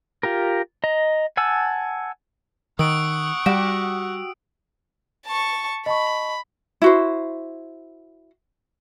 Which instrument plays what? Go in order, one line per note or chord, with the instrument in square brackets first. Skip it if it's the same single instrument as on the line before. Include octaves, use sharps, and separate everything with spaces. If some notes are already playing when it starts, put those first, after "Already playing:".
[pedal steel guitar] F4 G4 A#4
D#5 A#5
F#5 G#5 A5 E6
[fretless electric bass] D#3 [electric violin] F#5 C#6 [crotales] D#6 E6 D7
[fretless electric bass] G3 [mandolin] F#4 G4
[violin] A5 C#6
[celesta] D#5 A5 C#6 [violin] B5
[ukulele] E4 F#4 C5